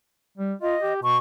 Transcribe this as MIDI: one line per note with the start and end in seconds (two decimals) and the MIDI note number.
0.38 0.53 55
0.62 0.76 65
0.62 0.94 75
0.82 1.01 67
1.03 1.18 47
1.03 1.17 85